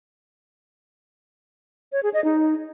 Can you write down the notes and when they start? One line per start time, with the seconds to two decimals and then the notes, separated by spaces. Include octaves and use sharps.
1.92 C#5
2.03 G#4
2.14 D#5
2.24 D#4